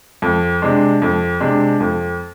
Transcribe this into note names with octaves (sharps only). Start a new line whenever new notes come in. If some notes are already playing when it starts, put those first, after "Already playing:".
F2
C3 G#3 D4
F2
C3 G#3 D4
F2